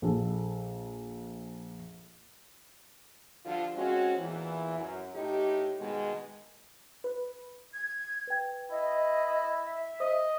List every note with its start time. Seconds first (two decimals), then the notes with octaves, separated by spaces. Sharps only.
0.02 A#1 A4
3.45 D3 F3 G3 F4
3.76 G#3 C4 C#4 F#4
4.17 E2 A#2 E3
4.77 F#2
5.14 A2 D#4 G4
5.80 B2 D#3 G#3
7.04 B4
7.73 G#6
8.27 B4 G5
8.71 E4 D#5
9.64 E5
10.00 C5 D#5 D#6